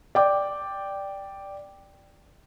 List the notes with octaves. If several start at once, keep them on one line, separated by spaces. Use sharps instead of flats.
D5 G5 D6